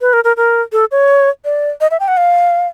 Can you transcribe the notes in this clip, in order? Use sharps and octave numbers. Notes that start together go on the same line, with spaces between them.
B4
A#4
A#4
A#4
A4
C#5
D5
D#5
E5
G5
F#5
F5